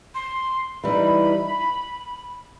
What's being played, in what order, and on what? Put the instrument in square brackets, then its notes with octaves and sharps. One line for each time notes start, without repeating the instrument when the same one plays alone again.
[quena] C6
[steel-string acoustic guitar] E3 G3 D#4 [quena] B5